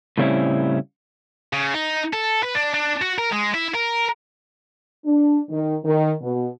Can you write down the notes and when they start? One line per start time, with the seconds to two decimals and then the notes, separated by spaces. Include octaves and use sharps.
0.18 A2 C#3 G3 C4 C#4 E4
1.53 C#3
1.74 D#4
2.13 A4
2.43 B4
2.55 D4
2.74 D4
3.02 F#4
3.18 A#4
3.32 G#3
3.54 E4
3.74 A#4
5.05 D4
5.49 D#3
5.84 D#3
6.21 B2